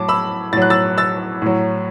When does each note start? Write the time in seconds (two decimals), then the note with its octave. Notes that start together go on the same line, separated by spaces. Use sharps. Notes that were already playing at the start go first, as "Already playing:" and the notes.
Already playing: A2 F#3 A5 D6
0.09 B5 E6
0.52 A2 A6
0.57 F#3 F#6
0.70 E6 A6
0.98 E6 A6
1.42 A2 F#3